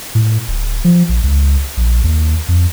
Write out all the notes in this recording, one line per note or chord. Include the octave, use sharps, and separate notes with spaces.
A2
D1
F3
A#1
C#2
A#1
D#2
F2